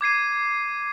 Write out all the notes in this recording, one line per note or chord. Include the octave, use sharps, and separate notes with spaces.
D6 G#6 C7 D#7